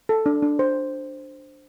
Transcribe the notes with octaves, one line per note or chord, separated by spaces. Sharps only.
A4
D4
D4
C5